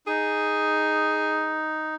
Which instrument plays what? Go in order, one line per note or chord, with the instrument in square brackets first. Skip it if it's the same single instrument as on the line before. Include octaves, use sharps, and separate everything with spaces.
[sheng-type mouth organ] D#4 [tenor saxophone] G#4